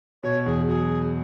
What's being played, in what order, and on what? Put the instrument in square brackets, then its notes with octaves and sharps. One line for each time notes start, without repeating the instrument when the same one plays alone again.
[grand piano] B2 [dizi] C#5
[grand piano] E2 [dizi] G#4
[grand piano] F#3 [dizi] G#4